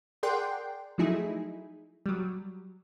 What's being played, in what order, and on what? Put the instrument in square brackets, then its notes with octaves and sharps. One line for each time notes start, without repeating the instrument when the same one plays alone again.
[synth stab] G#4 A#4 D5 F#5 G5 C6
F3 F#3 A3 D#4 E4 G#4
F#3 G3